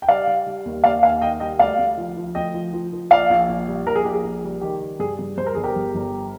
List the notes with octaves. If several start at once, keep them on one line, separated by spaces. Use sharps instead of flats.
G5
G3 D5 F5
G3
G3
D#2
D#2 D5 F5
D#2 F5 G#5
D#3 D#5 G5
G3 D#5 G5
D2 D5 F5
D2
F3
F3
D2 D#5 G5
F3
F3
F3
A#1 D5 F5
A#1
A#1
G3
A#1 A#4
G#4
A#1 G4
G#4
A#1
G3
D#3 G4
G3
G2 G#4
G2
G2 C5
A#4
G1 G#4
G4 A#4
G1
G1